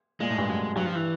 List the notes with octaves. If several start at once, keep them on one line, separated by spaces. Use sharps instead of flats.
A#2 G#3
A2
G2
F#2
G2 F#3
F3
E3